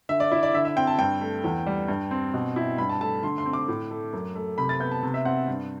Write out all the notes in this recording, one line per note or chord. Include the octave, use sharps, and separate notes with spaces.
D3 E5
D5
E4 D5
D5
D3 E5
E5
C4 G5
A5
G2 G5
A3
E2
G3
G2
C4
B2
E4
G2 B5
A5
A3 A5
D3 C6
C6
C4
D6
A2
A3
F#2
A3
C3 B5
A6
B3 G6
A5
C3
E5
C4 F#5
G2